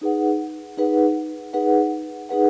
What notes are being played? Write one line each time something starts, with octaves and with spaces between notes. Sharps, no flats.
D#4 G#4 B4 F#5
D#4 G#4 B4 F#5
D#4 G#4 B4 F#5
D#4 G#4 B4 F#5